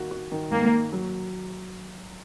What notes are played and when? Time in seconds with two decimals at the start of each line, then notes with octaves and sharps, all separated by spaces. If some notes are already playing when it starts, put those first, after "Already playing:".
Already playing: D#3 A#3 F#4
0.11 F#4
0.32 D#3
0.52 D#3 A#3
0.72 A#3
0.93 F#3